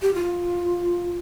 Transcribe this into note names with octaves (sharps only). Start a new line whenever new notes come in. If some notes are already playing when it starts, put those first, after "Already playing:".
G4
F4